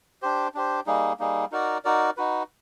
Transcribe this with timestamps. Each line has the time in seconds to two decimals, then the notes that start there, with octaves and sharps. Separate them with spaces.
0.22 D4 G4 C5
0.54 D4 G4 C5
0.86 G3 A#3 D#4 G#4
1.20 G3 A#3 D#4 G#4
1.52 D#4 F#4 A#4 D5
1.85 D#4 F#4 A#4 D5
2.17 D#4 F#4 B4